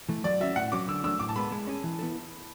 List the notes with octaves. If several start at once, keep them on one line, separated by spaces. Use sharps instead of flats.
E3 A3
F#3 D5
C#4 F#4 E5
A2 F#5
F#3 C#4 F#4 C#5 D6
D3 E6
F#3 A3 D4 E6
A2 D6
A5
G#3 B3 B5
G#3
C#4 G#4
E3
B3 E4 A4